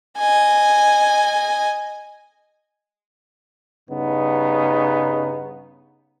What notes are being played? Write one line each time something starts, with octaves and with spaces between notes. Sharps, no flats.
D#5 G#5
G2 C#3 B3 D#4